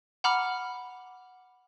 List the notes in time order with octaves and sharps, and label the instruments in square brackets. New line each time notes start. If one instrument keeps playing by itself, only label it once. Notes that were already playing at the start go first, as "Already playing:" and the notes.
[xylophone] F#5 A#5 B5 D6 F6